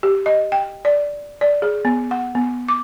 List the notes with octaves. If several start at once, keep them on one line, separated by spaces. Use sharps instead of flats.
G4
D#5
G5
D5
D5
G#4
B3
F#5
B3
D6